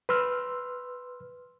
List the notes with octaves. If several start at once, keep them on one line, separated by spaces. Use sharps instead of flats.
B4 C6 E6 F6